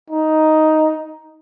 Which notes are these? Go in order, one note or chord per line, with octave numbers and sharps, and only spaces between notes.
D#4